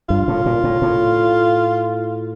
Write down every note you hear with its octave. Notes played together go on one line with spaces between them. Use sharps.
G2 F4
A2
A#2
A2
A2